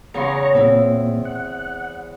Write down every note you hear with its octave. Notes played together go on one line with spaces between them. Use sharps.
E2 C#3 A#5 C6 C#6
A#2 C4 E4
F#5